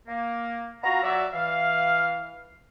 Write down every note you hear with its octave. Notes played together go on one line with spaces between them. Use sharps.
A#3
B3 F4 F#4 F5 A#5
F#3 D5 E5
E3 F5